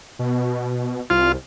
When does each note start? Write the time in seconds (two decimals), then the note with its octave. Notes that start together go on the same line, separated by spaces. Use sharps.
0.19 B2
1.10 C2 F4